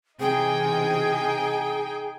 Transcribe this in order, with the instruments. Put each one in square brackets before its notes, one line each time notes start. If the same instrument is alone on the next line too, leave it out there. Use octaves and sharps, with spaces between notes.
[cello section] C3 E3 [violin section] D#4 G5 G#5 [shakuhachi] G#4